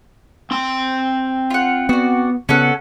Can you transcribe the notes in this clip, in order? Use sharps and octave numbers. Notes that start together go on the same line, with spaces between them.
C4 C6
F4 F#5
B3 F#4 D5
C#3 B3 C#4 A4 F#5